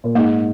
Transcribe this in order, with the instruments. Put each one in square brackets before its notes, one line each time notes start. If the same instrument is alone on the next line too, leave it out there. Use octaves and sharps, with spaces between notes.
[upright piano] A#2
[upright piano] G#2 [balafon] A#3